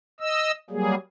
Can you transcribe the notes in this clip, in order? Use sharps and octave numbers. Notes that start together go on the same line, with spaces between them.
D#5 E6
F#3 G3 A#3 G#4